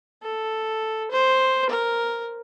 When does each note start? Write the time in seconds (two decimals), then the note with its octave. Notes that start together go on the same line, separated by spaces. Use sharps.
0.23 A4
1.11 C5
1.70 A#4